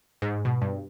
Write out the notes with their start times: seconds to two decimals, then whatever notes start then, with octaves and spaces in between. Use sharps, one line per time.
0.22 G#2
0.45 B2
0.62 G2